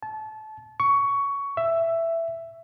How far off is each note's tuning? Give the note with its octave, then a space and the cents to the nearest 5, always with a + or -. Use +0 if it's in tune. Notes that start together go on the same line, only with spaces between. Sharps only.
A5 -25
C#6 +15
E5 +10